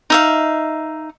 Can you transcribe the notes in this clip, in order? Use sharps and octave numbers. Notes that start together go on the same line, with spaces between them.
D#4 E5 F5